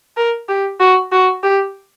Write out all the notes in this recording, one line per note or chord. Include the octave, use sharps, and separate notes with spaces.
A#4
G4
F#4
F#4
G4